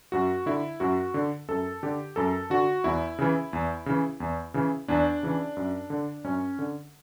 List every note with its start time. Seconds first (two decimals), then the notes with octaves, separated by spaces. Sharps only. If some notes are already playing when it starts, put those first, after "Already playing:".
0.12 F#2 F#4
0.46 D3 E4
0.80 F#2 F#4
1.14 D3
1.49 F#2 A4
1.83 D3 G4
2.16 F#2 A4
2.50 D3 F#4
2.84 E2 E4
3.19 C#3 E3
3.53 E2
3.86 C#3 E3
4.20 E2
4.54 C#3 E3
4.88 E2 D4
5.23 C#3 E3
5.57 F#2
5.90 D3
6.24 F#2 C#4
6.59 D3